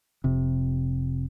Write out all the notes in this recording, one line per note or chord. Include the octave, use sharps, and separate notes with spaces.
F1 C3